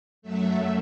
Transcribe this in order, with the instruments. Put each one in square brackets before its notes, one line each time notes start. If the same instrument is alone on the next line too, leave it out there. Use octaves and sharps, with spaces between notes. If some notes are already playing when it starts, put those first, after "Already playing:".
[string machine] F#2 F#3 A3 E5